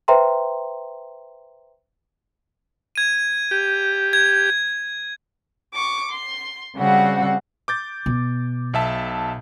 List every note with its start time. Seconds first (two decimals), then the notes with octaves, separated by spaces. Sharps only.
0.08 B4 C5 E5 G5 A#5 C6
2.95 G#6 D#7
3.51 G4
4.13 G#6
5.75 C#6 D6
6.12 C6
6.78 C#3 G3 C4 F#4 F#5
7.68 D6 G6 A6
8.06 B2
8.74 B1 E5 A5